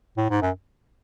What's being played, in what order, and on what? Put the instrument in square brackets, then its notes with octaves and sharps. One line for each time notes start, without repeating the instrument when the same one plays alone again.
[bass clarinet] A2
G#2
F#2